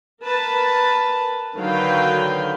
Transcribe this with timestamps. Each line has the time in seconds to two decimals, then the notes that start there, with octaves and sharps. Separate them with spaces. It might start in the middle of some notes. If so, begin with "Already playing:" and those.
0.22 A#4 B4 A5
1.57 D3 D#3 F#3 B4 F5 G5